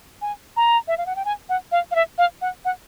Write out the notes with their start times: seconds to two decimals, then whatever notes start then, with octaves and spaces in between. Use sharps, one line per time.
0.22 G#5
0.56 A#5
0.88 E5
0.98 F5
1.06 F#5
1.16 G5
1.25 G#5
1.49 F#5
1.72 F5
1.91 F5
1.95 E5
2.18 F5
2.41 F#5
2.65 F#5